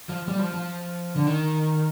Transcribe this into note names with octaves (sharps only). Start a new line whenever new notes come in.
F3
G3
F3
F3
D3
D#3